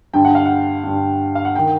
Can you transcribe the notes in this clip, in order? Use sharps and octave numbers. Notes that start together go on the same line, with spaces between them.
G2 D3 G5
F#5
F5
F#5
G2 D3
F5
F#5
D#3 G5